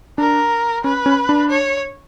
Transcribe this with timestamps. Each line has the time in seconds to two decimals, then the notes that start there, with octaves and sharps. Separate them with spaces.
0.18 D4 A#4
0.84 C#4 B4
1.06 C#4
1.29 D4
1.50 C#5